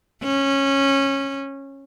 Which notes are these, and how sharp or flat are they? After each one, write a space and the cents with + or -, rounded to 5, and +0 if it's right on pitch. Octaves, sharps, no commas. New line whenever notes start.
C#4 -15